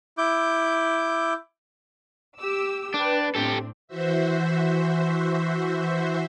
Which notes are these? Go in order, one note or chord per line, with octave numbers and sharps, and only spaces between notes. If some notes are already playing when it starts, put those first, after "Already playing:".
E4 D6 G6
G4 D6 E6
D4 B4 G5
A2 C4 D4 G4 A4
E3 F#4 C5 E5